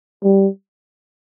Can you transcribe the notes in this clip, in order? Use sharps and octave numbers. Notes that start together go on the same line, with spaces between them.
G3